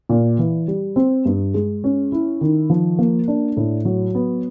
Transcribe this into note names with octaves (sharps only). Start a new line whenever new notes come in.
A#2
E3
G3
C4
G2
G#3
C#4
E4
D#3
F3
A#3
D4
A2
F#3
B3